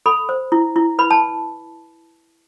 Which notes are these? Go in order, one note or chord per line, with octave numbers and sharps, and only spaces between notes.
A4 B5
C5
E4
E4
B4 B5
A5